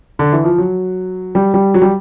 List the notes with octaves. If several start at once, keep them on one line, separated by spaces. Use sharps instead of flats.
D3
E3
F3
F#3
G3
G3
F#3
G3